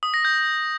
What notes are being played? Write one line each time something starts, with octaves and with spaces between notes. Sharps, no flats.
D#6
A#6
G6